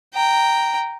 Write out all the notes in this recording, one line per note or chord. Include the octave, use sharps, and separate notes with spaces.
G5 A#5